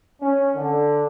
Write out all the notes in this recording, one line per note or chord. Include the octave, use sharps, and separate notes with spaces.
C#4
D3